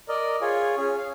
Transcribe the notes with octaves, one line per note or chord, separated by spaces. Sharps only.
A#4 D5 D#5
F4 G#4 C#5
C#4 G#4
F5